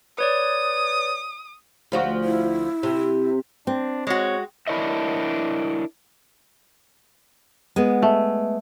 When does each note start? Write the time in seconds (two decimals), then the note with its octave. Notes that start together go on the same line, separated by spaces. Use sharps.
0.18 B4 C#5 D5 D#6
1.92 D2 F3 F#4
2.24 E4
2.83 C3
3.67 C4 D4
4.07 G#3 F#4 C#5
4.67 D4 E4 A#4 C#5 D#5 E5
7.76 G#3 B3
8.02 A3